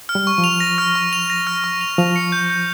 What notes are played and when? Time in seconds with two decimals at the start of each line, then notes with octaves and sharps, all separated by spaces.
0.09 F6
0.15 G3
0.27 C#6
0.38 F3
0.44 F7
0.60 A#6
0.78 F6
0.95 C#6
1.13 F7
1.30 A#6
1.47 F6
1.64 C#6
1.81 F7
1.98 F3 F7
2.16 C#7
2.32 G6
2.50 G6